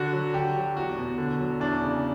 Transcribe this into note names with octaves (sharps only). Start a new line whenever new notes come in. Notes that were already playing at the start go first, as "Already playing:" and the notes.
Already playing: D3 F#4
F#3
D3 G4
F#3
E2 F#4
B2
D3
F#3
E2 D4
C#3